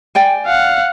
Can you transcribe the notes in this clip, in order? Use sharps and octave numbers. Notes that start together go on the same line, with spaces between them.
D5 G5 G#5
F5 F#5